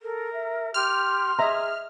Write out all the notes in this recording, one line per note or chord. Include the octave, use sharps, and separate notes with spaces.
A4 A#4
E5
G4 C6 F6
G#4 D#5 E5 A#5